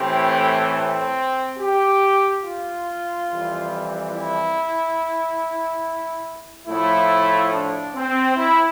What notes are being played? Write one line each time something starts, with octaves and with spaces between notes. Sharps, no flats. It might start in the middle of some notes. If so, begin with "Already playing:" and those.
Already playing: A2 E3 A3 C4 G4
C4
G4
F4
F2 E3 G3
E4
A2 F3 A3 E4
D4
C4
E4